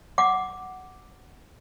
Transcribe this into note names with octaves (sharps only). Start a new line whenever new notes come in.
F#5 D6